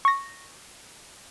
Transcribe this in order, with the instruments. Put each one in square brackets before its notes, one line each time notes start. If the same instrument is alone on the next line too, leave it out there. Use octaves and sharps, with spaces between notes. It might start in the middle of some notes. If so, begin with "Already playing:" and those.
[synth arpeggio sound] C#6 A#6